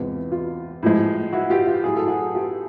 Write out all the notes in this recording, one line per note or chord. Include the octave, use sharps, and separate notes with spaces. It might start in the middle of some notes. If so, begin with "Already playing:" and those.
Already playing: E2 C3 E3 G#3 F4
F4
A2 F3 G#3
E4 F#4
F4 G4
F4
A2 F#3 G#4
A4
F#4 G#4
F4 G4